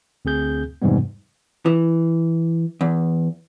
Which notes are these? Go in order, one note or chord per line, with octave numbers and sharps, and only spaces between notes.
D2 C4 G#4 G6
F2 G#2 C3 E3 G3 B3
E3
E2